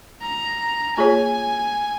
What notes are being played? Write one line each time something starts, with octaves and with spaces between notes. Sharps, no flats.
A#5
A#3 F4 G#4 C#5 G#5